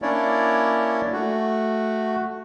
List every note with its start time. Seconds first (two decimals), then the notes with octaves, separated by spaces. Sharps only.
0.02 A#3 C#4 D4 E4 C#5 D5
1.13 A3 F#4